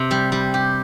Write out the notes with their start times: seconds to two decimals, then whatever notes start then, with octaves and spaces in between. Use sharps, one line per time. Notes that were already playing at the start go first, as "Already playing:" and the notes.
Already playing: C3
0.11 G3
0.32 G3
0.54 G4